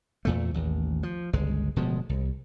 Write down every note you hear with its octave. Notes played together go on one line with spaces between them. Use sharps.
E2 A#2 A3
A1 D#2
F3
G1 C#2 G#3
D1 B2 F3 G#3
C2